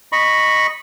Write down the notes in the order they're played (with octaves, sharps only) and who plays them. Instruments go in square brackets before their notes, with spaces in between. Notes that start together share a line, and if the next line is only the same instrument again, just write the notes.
[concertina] D#5 B5 C#6